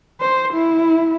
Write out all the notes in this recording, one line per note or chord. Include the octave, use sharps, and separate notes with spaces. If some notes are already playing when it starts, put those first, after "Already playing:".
C5
E4